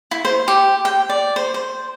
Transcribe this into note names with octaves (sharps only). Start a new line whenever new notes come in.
E4
C5
G4
G5
D5
C5
C5